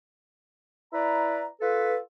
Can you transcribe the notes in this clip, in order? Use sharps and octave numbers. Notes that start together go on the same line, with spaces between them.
E4 B4 D5 A#5
F4 A4 B4